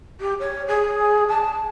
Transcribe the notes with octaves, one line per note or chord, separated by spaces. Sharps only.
G4
C#5
G#4
A5